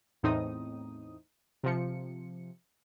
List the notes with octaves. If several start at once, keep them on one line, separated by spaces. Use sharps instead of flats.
E2 A2 C4 D#4 D#6
C3 F3 C#7